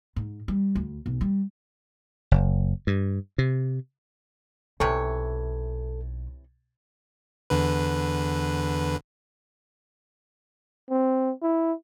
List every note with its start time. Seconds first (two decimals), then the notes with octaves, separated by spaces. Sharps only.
0.16 G#2
0.48 G3
0.75 D2
1.06 B1
1.21 G3
2.31 F#1
2.87 G2
3.38 C3
4.80 B1 C3 E3 A4 C#5
7.50 E2 D3 B4
10.90 C4
11.42 E4